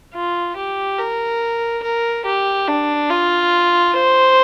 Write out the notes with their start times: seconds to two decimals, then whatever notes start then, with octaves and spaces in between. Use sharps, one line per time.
0.14 F4
0.56 G4
0.98 A#4
1.82 A#4
2.25 G4
2.68 D4
3.10 F4
3.93 C5